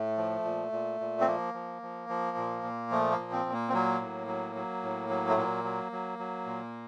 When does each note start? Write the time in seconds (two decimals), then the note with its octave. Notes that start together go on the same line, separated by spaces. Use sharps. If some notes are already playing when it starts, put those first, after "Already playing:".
Already playing: A2 A3
0.18 F3
0.45 A#2
0.72 A#2
1.01 A#2
1.21 C4
1.27 F3 A#3
1.54 F3
1.82 F3
2.09 F3
2.37 A#2
2.63 A#2
2.91 F3 A3
3.11 A#3
3.19 A#2
3.32 C4
3.46 A#2
3.53 A#3
3.68 C4
3.73 F#3 A#3
4.01 A2
4.27 F#3
4.55 F#3
4.83 A2
5.09 F#3
5.29 A3
5.37 A#2 A#3
5.64 F#3
5.92 F#3
6.19 F#3
6.46 A#2